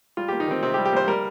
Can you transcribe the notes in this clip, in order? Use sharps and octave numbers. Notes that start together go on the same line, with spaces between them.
G3 F4
A#3 G4
D#4
D#3 C4
C3 C4
G4
G3
G4
A#3 C5
G3 A#4